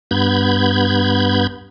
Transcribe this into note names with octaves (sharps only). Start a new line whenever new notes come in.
G2 B3 B5 G6 G#6